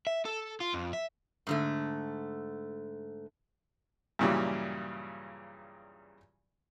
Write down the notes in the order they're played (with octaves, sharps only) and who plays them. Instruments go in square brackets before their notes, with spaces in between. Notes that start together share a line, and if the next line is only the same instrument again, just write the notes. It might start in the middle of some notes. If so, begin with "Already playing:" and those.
[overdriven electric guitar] E5
A4
F4
F2
E5
[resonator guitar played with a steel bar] G#2 D3 A3
[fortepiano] G2 A#2 C#3 E3 F#3 G3